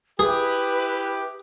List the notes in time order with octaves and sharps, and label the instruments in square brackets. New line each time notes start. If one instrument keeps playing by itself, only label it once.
[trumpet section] E4 G4 [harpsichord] G#4 [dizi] B4